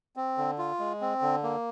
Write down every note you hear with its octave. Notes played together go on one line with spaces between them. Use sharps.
C4
D3
F4
G#3
C4
D3
A#3